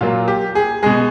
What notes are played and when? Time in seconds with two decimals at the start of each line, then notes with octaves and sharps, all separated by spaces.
0.01 A#2 F#3 A#3 F4
0.28 G4
0.55 G#4
0.83 B2 G#3 G#4